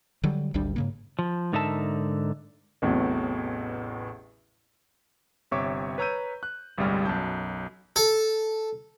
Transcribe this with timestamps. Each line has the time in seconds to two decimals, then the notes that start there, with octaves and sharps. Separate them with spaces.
0.23 D3 F#3 G3
0.54 G#1 D2 G3 D4
0.76 G#2 C#3 A#3
1.19 F3
1.53 G#2 D3 D#4 A#4 E5 A5
2.82 A1 E2 A2 C3 F#3
5.51 G1 C3 C#5 E5 C#6 D6
5.98 B4 C#5 A#5 E6 G6 D#7
6.43 F#6
6.78 G1 C2 A2 G3 G#3 F6
7.05 B1 F#2 A5 G6
7.96 A4